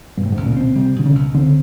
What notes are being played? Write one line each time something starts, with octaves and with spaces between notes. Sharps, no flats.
G2 B2
A2
G#2
C#2
A#2
B2 C4
C3 G3
B2 D3
C#3
C#2
D3 C4